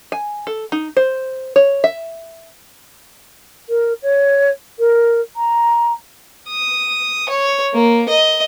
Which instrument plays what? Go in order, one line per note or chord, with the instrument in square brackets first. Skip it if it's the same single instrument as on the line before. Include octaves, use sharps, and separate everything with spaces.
[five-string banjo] G#5
A4
D#4
C5
C#5
E5
[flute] A#4
C#5
A#4
A#5
[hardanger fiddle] D#6
C#5
A#3
D#5